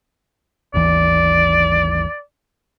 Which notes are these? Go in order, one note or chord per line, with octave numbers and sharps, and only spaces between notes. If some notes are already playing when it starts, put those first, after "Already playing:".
G#1 D#2 E3 D5